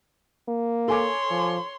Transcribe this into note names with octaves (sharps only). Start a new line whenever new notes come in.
A#3
A4 C#5 G#5 C6 D6
F3